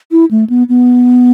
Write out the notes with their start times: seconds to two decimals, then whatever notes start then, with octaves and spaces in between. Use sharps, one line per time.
0.12 E4
0.31 A3
0.50 B3
0.69 B3